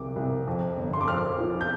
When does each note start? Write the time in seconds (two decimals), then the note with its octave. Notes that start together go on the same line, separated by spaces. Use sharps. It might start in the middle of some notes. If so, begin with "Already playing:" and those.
Already playing: C2 D6
0.16 C2
0.47 F2
0.77 G1
0.93 C6
1.01 D6
1.08 F2 F6
1.38 F3
1.61 G6